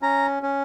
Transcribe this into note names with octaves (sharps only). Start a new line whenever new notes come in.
C#4 A#5
C#4